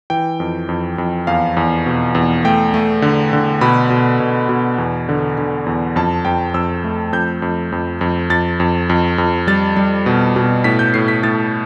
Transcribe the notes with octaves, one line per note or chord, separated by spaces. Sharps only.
E3 G5
F2
F2
F2
E2 F5
E2
B2
E2
A3 G5
A3
D3
D3
B2 B5
B2
B2
B2
E2
D3
D3
E2
F2 A5
F2 G5
F2 E6
A3
F2 G6
F2
F2
F2
F2 A6
F2
F2
F2
G3 A6
G3
B2
B2
A2 B6
G6
A2 C7
B6
A2 A6